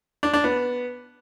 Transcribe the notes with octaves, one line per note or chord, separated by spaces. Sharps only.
D4
D4
B3